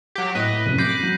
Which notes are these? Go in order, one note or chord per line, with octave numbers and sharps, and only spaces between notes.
F#3 G4 B6
A2 B4 D#5 F#6 B6
F1 F#2 D#7
B5 D6 G6 A#6 C7
F#3